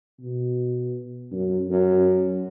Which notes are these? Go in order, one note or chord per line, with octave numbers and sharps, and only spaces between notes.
B2
F#2
F#2